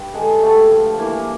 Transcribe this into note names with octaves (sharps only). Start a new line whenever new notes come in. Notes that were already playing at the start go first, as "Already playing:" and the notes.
Already playing: G2
D3 G#3
G2 A3
F3
E3 A#3